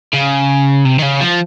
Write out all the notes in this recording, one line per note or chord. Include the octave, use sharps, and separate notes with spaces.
C#3
C3
D#3
C#3
F3